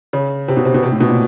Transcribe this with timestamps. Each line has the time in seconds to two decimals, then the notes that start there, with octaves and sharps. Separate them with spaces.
0.13 C#3
0.48 C3
0.57 B2
0.65 C3
0.74 B2
0.83 C3
0.92 A2
1.00 B2
1.09 A#2